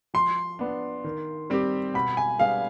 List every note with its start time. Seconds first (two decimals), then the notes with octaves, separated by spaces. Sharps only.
0.14 F3 C6
0.59 B3 D4
1.04 D#3
1.50 G3 C4 G4
1.94 B2 B5
2.17 G#5
2.39 G3 B3 D4 G#4 F5